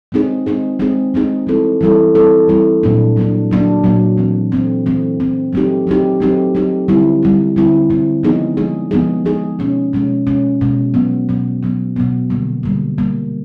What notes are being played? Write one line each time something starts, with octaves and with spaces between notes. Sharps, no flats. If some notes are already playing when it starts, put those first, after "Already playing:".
G#3 C4 D#4 G#4
G#3 C4 D#4 G#4
G#3 C4 D#4 G#4
G#3 C4 D#4 G#4
E3 G3 C4 E4 A4
E3 G3 C4 E4 A4
E3 G3 C4 E4 A4
E3 G3 C4 E4 A4
A#2 F#3 A#3 D4
A#2 F#3 A#3 D4
A#2 F#3 A#3 D4
A#2 F#3 A#3 D4
E3 A3 C4
E3 A3 C4
E3 A3 C4
E3 A3 C4
F#3 A3 C4 D#4 G4
F#3 A3 C4 D#4 G4
F#3 A3 C4 D#4 G4
F#3 A3 C4 D#4 G4
D3 G3 C4 E4
D3 G3 C4 E4
D3 G3 C4 E4
D3 G3 C4 E4
F3 G#3 B3 D#4 G#4
F3 G#3 B3 D#4 G#4
F3 G#3 B3 D#4 G#4
F3 G#3 B3 D#4 G#4
B2 G#3 C#4
B2 G#3 C#4
B2 G#3 C#4
B2 G#3 C#4
B2 F#3 B3
B2 F#3 B3
B2 F#3 B3
B2 F#3 B3
D3 G3 A#3
D3 G3 A#3
D3 G3 A#3